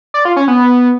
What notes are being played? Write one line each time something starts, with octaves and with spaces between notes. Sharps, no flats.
D5
F4
C#4
B3